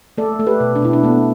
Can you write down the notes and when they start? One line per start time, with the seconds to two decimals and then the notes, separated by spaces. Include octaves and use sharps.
0.18 A3 A4 D5
0.40 A3
0.47 G4 B4
0.60 B2
0.76 D4
0.82 B2 E4
0.93 D4
1.03 A3 B3